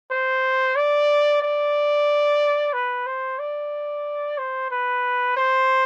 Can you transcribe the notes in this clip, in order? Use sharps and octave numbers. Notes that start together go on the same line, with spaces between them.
C5
D5
D5
B4
C5
D5
C5
B4
C5